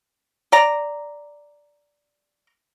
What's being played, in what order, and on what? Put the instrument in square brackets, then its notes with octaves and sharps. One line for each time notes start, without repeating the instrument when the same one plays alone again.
[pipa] D5 A#5